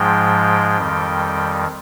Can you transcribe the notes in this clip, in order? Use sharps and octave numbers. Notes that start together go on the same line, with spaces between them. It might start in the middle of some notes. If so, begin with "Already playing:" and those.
Already playing: G#2 F3 G#3 G5
F2 D#3 G3